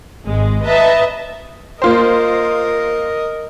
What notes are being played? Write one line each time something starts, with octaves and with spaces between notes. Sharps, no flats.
G#1 G#3
B4 D#5 E5 A5 A#5
A#3 F4 A#4 C5 D#5